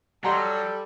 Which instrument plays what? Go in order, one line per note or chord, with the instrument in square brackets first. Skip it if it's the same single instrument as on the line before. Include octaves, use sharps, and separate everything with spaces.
[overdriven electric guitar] F#3 [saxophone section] G3 [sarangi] A4 [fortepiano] F#5 A#5 C6